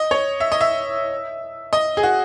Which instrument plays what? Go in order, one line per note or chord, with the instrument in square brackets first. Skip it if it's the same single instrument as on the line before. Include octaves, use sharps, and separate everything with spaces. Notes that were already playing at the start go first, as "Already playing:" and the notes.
Already playing: [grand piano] D#5
C#5
E5
D#5
E5
D#5
G#4
F#4